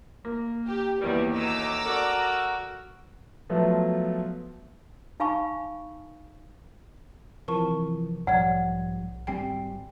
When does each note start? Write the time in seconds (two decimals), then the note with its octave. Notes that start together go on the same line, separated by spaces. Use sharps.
0.25 A#3
0.66 G4
1.02 D#2 E3 F#3 G3 A#3 B3
1.35 F#3 A3 D#4 A#5 D6 E6
1.86 F#4 A4 A#4 D5
3.50 F3 F#3 A3 B3 F4
5.20 D#4 F5 G#5 B5 C#6
7.48 C3 E3 F3 A#4 A5 C#6
8.27 B1 G#2 F3 G3 C#5 D5 F#5 G#6
9.27 G#1 G3 C4 G5 G#5 C7